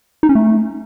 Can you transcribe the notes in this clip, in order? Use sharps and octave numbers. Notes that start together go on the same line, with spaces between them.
D#4
C#4
A3